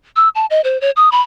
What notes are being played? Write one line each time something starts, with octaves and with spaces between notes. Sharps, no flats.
E6
A5
D#5
C5
C#5
D#6
B5